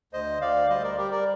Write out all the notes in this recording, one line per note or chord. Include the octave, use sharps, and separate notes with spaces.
D2 C5 D#5
D2 D5 F5
G3 C5 D#5
A#4 D5
G3 G4 A#4
A#4 D5